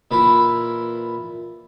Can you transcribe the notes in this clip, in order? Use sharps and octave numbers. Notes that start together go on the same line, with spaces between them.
A#2 E3 B4 B5